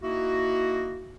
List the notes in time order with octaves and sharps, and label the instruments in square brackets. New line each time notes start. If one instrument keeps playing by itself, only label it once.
[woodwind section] A#3 D#4 E4 F#4